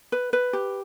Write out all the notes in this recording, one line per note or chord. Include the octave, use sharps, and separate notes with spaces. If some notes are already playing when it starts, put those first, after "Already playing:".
B4
B4
G4